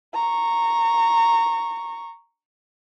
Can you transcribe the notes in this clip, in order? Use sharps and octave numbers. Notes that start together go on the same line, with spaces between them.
A#5 C#6